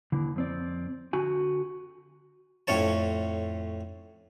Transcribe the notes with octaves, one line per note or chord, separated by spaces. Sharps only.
D#2 D3 E3
F2 C4 D5
D3 F#4 G#5
F2 A2 C#4 C#5 A5